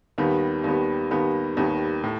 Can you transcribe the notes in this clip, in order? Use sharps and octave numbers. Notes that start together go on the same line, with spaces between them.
D#2 D#3 G3 B3
D#2 D#3 G3 B3
D#2 D#3 G3 B3
D#2 D#3 G3 B3
A2